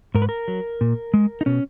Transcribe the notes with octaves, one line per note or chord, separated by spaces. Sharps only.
G#2 A#4
B4
A#4
F#3
A#2
G#3
D#4
B2 C#4